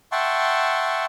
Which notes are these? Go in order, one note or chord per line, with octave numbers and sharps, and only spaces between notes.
E5 F#5 G5 A5 C6 C#6